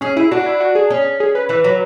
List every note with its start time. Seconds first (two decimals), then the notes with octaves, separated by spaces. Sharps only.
0.01 C#4 G#4
0.16 E4 G#4
0.31 D4 F#4
0.46 E4
0.60 F#4
0.75 G#4
0.90 C#4
1.20 G#4
1.35 B4
1.49 E3 B4
1.64 F#3